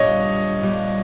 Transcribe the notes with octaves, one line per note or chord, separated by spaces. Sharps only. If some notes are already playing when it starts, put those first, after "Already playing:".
Already playing: A#2 G3 B3 D4 G4 C#5 D#5
A#2 G3 B3 D4 G4